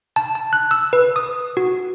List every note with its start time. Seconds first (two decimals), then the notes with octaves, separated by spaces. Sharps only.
0.16 A5
0.35 A5
0.53 F#6
0.71 E6
0.93 B4
1.16 D#6
1.57 F#4